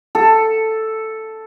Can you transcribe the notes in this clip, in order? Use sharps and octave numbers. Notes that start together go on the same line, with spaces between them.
A4